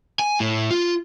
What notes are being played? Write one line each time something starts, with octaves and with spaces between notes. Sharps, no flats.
G#5
A2
F4